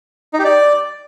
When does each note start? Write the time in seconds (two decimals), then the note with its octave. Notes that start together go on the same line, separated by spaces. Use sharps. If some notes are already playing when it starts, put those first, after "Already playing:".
0.34 D#4
0.39 G4
0.45 D5